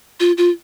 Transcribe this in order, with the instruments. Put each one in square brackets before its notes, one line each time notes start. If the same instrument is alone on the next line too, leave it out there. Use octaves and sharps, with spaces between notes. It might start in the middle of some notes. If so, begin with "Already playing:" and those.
[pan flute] F4
F4